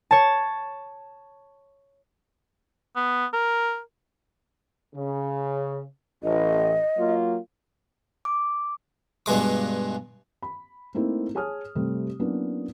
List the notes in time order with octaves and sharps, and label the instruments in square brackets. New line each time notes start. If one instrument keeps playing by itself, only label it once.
[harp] C#5 A5
[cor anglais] B3
A#4
[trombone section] C#3
[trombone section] A1 [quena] D#5
[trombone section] F#3 A#3 F4
[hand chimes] D6
[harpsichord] G2 B2 G#3 D6
[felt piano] B5
A3 A#3 C4 D#4 E4
G#4 C#5 G#5 A5 D#6 F6
C3 G3 A3 C4
F#3 A#3 B3 C#4 D4 E4